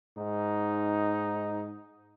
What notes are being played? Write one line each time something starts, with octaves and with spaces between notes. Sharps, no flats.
G#2 D#4